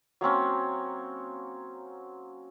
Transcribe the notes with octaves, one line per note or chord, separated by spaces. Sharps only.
F#3 A#3 C4 C#4